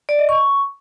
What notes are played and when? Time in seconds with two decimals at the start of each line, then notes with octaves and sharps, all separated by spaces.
0.09 D5
0.19 D#5
0.29 C#6